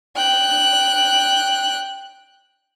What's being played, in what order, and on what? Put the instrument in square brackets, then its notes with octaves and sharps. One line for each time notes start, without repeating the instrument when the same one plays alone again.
[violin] G5 F#6